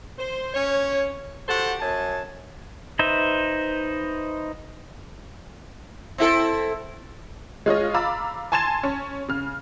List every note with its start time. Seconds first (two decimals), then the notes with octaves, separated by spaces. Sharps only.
0.19 C5
0.54 C#4 C#5
1.49 F#4 G4 A4 C5 F#5
1.81 F#2 G#5 A5
2.99 D#4 B4 C5 E5
6.18 C4 E4 A4
7.66 G#3 F4 C#5 D#5
7.94 F5 A#5 B5 D6 E6 A6
8.52 G#5 A5 C6 G#6 A6 E7
8.83 C#4
9.29 C#3 F6